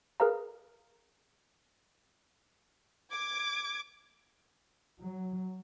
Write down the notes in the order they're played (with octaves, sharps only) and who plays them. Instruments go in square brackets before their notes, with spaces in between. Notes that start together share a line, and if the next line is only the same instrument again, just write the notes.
[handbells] G#4 A#4 B4 F5 A#5
[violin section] D6 G#6
[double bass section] F#3